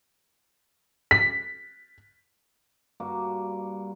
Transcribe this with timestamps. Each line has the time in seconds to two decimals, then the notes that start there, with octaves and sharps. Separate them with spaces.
1.11 B6
3.00 G2 A#3 F#4 D6